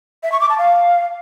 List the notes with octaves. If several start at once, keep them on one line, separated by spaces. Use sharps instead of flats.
E5
C#6
D6
A5
F5